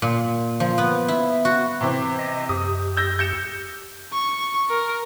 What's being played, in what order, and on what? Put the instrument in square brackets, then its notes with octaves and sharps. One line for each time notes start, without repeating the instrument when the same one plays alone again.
[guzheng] A#2
F3
B3
E4
F#4
[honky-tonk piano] C3 E3 C4
[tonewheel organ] D#5
[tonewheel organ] F#2 G4 [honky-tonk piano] D#6
[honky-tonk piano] E6 G6 A#6
G6 C#7 E7
[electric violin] C#6
A#4